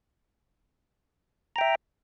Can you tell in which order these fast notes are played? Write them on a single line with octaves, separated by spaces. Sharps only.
A#5 G5 E5